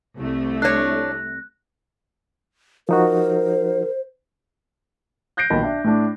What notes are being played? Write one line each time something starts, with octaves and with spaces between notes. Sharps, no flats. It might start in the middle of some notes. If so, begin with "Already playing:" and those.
C2 A3
D4 C#5 F#6 A#6
F3 D#4 F#4 A#4 C5
F#6 G6 A#6 C7 D7
B1 A#2 D#3 A5 B5
D4 E5
A2 A3 D4